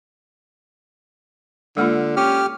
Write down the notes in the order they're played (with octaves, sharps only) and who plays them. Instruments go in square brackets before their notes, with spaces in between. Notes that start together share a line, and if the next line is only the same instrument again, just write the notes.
[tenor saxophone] D3 [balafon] G#3 A#3 F4
[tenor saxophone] C#4 [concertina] G4 F6